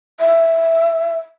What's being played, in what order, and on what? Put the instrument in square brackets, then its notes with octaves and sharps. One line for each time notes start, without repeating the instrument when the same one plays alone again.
[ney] E5